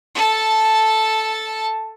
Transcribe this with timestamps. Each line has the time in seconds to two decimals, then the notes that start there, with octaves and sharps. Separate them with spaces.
0.15 A4 A5